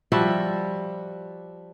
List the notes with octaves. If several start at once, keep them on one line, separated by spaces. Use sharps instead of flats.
F3 G3 F#4 E5